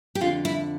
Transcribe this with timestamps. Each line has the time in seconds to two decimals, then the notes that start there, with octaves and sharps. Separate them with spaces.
0.15 G4
0.21 F2 D3 F4
0.45 E4